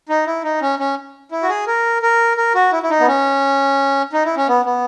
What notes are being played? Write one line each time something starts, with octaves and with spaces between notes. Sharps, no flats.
D#4
E4
D#4
C#4
C#4
E4
F#4
G#4
A#4
A#4
A#4
F#4
E4
E4
D#4
B3
C#4
D#4
E4
C#4
B3
B3